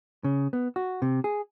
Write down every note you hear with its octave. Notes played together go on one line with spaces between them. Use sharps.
C#3
B3
F#4
C3
G#4